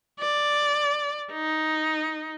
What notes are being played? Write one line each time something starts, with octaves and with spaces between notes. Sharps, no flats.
D5
D#4